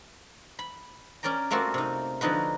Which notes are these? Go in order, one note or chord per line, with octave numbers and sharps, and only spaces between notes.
B5
C#4 A#4 D5 G5 A#5
G3 A3 A#3 C4 F4 F#4
C3 D#4
D3 F3 D#4 F#4 B4